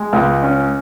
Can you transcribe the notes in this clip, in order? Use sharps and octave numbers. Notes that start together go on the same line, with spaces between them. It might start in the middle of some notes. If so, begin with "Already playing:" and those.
Already playing: G#3
C#2
C#4